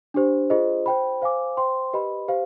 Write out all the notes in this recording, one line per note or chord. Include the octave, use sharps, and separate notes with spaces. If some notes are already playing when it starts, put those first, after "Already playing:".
D4 G4 C5
F4 G#4 C5 D#5
C5 G5 B5
C5 F5 G#5 D6
C5 G5 C6
G4 B4 D#5 B5
G4 C5 F5